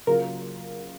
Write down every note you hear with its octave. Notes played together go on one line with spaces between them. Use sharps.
C#3 F#3 A#3 F4 G#4 A#4